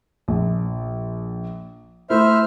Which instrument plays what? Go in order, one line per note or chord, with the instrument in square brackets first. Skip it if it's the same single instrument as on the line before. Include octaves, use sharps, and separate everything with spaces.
[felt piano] A#1
[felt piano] A3 E4 [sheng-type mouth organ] C5 E5 F6